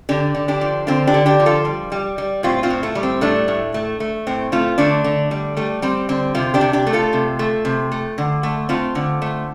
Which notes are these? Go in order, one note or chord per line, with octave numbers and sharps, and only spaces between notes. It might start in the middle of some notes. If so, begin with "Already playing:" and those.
D3 D4 G4
D3
D4 G4
F3
D3 C4 F4
D4 G4
D3
D4 G4
F3
F4 A4
G3
G3
G3
A2 C4 F4
C4 F4
A2
A3
G3
C4
A2 A3 D4
A2
A3
A3
A2 C4
A3 C4 F4
D3 A3 D4
D3
G3
G3 A3
G3 C4
D3 C4
C3 C4 F4
D4 G4
C3
D4 G4
A3
F4 A4
C3
A3
C3
A3
D3
A3
A3 C4 F4
D3
A3